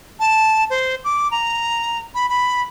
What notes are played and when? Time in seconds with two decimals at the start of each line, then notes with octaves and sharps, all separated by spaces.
0.20 A5
0.70 C5
1.04 D6
1.31 A#5
2.15 B5
2.30 B5